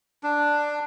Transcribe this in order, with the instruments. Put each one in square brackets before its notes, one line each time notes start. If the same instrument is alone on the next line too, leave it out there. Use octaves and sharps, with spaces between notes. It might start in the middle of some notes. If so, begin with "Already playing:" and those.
[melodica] D4